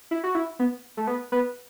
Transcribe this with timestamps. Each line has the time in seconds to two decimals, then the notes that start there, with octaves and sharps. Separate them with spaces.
0.11 E4
0.24 F#4
0.35 E4
0.59 B3
0.97 A3
1.07 B3
1.32 B3